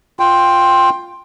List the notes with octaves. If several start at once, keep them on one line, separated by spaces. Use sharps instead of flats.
F4 G5